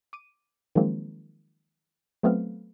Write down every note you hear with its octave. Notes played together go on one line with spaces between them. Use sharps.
D6 D7 D#7
D#3 F3 F#3 G#3 A#3 C4
F#3 A3 B3 C4 F5